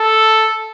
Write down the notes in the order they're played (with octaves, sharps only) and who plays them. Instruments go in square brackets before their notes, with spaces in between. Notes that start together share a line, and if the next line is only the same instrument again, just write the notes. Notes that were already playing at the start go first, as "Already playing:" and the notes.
Already playing: [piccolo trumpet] A4